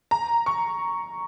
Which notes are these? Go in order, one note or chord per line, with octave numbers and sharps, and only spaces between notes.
A#5
C#6